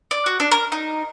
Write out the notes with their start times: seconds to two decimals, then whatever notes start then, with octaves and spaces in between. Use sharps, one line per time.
0.11 D5
0.26 F#4
0.40 D4
0.52 A#4
0.72 D#4